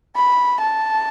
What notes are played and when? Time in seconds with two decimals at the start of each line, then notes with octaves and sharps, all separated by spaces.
0.16 B5
0.61 A5